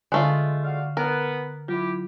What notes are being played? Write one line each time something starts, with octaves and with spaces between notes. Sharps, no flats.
D3 G#3 A3 F4
F#4 D5 F5
B3 A#4
F#3 E4 F4 G4